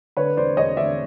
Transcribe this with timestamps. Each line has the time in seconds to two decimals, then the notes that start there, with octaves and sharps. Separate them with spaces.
0.17 D3 B4 C#5
0.37 E1 C5 D5
0.57 E1 C#5 D#5
0.77 D3 D5 E5